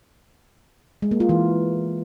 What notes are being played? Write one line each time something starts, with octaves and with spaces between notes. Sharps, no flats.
G#3
A#3
F4
E3